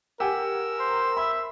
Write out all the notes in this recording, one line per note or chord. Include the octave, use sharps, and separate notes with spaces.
G4 A#4 F#5 G#5 E6
C5
E5 B5